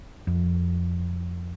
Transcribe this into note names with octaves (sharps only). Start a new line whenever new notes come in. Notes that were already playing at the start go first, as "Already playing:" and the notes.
F2